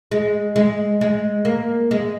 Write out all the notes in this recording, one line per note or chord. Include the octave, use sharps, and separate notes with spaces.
G#3
G#3
G#3
A#3
G#3